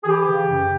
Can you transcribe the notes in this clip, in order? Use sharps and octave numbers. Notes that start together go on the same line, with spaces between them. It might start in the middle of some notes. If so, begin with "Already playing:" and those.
G#4
E3 G4
C#3
F#2